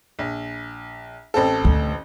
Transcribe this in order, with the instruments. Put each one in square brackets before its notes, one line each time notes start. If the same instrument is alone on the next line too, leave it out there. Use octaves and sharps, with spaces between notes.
[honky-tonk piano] A#1
A1 C4 A4
[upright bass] D2